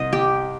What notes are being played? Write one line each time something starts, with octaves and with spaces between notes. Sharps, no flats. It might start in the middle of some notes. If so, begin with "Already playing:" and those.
Already playing: C2 D#5
G4